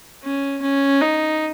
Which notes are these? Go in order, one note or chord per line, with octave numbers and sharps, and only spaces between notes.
C#4
C#4
D#4